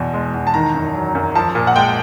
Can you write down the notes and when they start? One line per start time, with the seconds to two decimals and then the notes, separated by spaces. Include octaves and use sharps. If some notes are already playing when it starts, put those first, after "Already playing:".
Already playing: E2 B2
0.14 G#3
0.34 E2
0.47 A5
0.54 D#3 A#5
0.75 F#2
0.95 F#3
1.15 F#2
1.35 F3 A5
1.55 A#2
1.67 F#5
1.76 G#3 G5